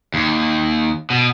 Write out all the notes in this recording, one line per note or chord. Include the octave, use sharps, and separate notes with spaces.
D#2
B2